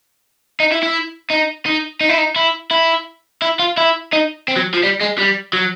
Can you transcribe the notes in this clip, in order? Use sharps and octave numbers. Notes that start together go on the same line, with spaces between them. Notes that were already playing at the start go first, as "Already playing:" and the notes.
D#4
E4
E4
D#4
D#4
D#4
E4
D#4
E4
E4
E4
F4
E4
D#4
C4
F#3
F3
G3
G#3
G3
F#3